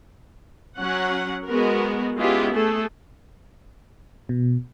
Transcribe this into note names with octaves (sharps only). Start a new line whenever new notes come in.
F#3 C#4 F#5
G#3 B3 F#4 A#4
G#3 B3 C#4 E4 F4 G4
A3 G#4 A4
B2